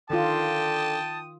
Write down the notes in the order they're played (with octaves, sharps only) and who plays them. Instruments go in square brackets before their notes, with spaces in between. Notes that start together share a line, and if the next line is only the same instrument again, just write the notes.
[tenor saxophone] D3 [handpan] D#3 F4 [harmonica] G5 D#6 [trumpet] A5